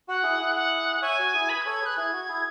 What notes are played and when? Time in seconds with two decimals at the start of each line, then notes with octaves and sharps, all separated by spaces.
0.08 F#4 F#5
0.23 E4 G#4
0.39 E4 G#4
0.56 F#5
1.02 C#5 E5 G#5
1.19 F#4
1.34 E4 G#4
1.49 G#4 B4 B5
1.61 G#6
1.66 A4 C#5
1.74 G#6
1.81 G#4 B4 F#6
1.97 E4 G#4 G#6
2.13 F#4
2.28 E4 G#4